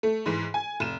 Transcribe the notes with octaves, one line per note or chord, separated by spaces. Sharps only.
A3
G#2 E3
G#5
F1 E7